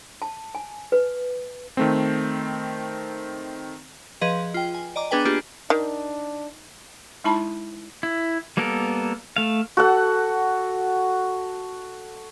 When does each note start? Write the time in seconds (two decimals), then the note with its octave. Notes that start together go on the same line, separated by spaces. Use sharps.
0.22 A5
0.55 G#5
0.92 B4
1.77 D#3 A3 C4
4.21 F3 G#4 B4 D#5
4.54 F4 G5
4.74 G#5
4.96 D5 D#5 A#5 D6
5.11 B3 D4 G#4 B4 G5 G#5
5.25 A#3 D4 F4 G4 G#4 B4
5.70 D#3 D4
7.24 G#3 D#4 E4 A5 B5
8.03 E4
8.57 G3 A#3 B3 A4 A#4
9.36 A3 F5
9.77 F#4 A4 F#5